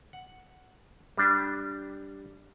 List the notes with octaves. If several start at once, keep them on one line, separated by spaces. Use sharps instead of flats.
F#5
G3 D4